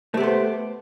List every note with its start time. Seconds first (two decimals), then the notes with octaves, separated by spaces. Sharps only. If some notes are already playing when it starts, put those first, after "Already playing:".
0.14 A3
0.17 G4
0.20 B3
0.23 C5